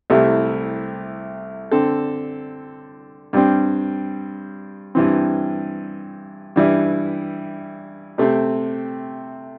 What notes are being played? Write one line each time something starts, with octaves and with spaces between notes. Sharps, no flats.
C2 C3 A3 E4
D3 C4 A4
G2 G3 C4
G2 E3 C4
G2 E3 G3 E4
C3 A3 C4